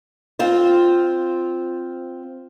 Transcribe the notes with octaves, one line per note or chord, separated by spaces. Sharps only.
C4 F4 C5